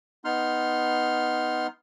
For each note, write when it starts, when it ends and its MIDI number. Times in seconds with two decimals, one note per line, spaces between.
0.25 1.67 59
0.25 1.67 63
0.25 1.67 84
0.25 1.67 89